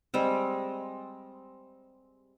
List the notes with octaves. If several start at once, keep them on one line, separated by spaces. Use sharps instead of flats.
G3 G#3 C4